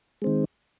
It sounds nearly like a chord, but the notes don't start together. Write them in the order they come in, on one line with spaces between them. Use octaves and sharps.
G#3 C4 D#3